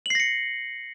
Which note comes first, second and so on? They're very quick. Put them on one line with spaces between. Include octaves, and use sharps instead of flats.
F#7 C7 A#6 C#7